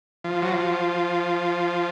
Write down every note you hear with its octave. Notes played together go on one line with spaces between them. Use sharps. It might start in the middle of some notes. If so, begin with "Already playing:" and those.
F3
F#3
F3